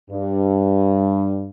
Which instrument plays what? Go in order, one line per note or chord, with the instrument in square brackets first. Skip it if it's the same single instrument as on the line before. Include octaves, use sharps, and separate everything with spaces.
[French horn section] G2